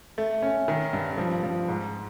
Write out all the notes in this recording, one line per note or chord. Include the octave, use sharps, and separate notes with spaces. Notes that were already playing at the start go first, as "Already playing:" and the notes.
A3
C#4
D#3
G2
F3
F3
G#2